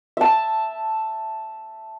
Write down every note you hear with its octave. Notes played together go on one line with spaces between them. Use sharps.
E5 A5